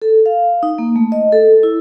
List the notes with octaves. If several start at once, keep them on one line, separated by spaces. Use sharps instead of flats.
A4
F5
D#4
A#3
A3
D#5
A4
E4